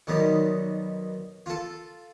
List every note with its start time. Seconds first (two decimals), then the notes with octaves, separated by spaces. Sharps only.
0.07 B1 B2 D#3 G3
1.46 F4 A4